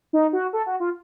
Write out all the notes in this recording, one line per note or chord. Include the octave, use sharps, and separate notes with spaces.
D#4
F#4
A4
F#4
F4